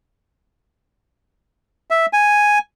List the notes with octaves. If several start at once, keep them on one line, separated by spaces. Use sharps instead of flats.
E5
G#5